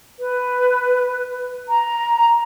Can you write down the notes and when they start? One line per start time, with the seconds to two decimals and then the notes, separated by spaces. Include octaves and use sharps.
0.20 B4
1.69 A#5